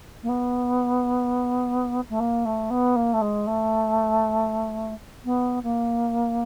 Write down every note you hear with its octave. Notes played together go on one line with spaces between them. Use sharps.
A#3
B3
A3
A#3
A3
B3
A#3
A3
G#3
A3
B3
A#3